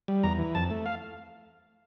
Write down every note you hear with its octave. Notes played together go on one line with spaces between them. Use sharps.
G3
E2 A#5
E3
F2 A5
A3
F5